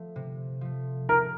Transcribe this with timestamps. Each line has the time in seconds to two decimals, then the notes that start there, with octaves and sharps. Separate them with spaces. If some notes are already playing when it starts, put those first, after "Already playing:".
Already playing: F3 A3
0.16 C3
0.61 F3 A3
1.09 C3 A#4